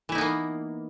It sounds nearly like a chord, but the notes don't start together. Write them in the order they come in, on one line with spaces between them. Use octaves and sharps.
E3 E4 D#4 B3 A#3